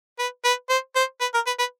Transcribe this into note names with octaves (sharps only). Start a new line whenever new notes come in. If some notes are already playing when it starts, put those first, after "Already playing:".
B4
B4
C5
C5
B4
A#4
B4
B4